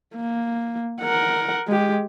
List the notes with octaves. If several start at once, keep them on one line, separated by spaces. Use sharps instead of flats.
A#3
A#4 F#5
G#3 G4